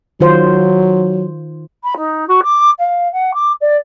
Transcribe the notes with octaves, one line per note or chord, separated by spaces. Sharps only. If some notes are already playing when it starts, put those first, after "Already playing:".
D#3 F#3 F4 C5
B5
D#4
F#4
D6
F5
F#5
D6
D5